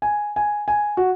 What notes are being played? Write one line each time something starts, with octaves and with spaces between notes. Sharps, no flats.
G#5
G#5
G#5
F#4